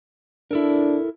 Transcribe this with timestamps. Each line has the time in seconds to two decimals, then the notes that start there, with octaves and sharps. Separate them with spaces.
0.51 D4 E4 A4 A#4